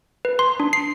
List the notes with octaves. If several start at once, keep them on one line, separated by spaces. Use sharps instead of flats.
B4
C6
D4
C7